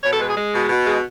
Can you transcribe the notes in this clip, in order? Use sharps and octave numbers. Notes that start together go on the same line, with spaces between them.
B2 C#5
A4
G#3 B4
G#4
G#3
B2
B2
G#3